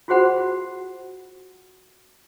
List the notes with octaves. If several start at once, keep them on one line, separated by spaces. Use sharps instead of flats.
F4 F#4 G#4 C5 F#5 B5